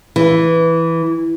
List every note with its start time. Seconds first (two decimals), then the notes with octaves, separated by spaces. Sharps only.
0.16 E3